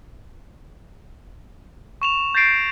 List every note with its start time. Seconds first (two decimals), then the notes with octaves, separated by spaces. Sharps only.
2.02 C#6 E7 F7
2.35 G6 A6 A#6 C7 D7